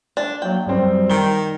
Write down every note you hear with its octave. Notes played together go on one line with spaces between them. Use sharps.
D4
F#3 A#3 G5
F#2 G3 C4
D#3 G7